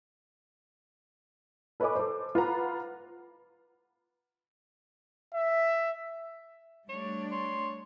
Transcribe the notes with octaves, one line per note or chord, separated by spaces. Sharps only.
A4 B4 C#5 D#5 G#5 D6
A4 C5
F4 B4 F#5 A#5
E5
G3 A3 D4 C#5
C#5 C6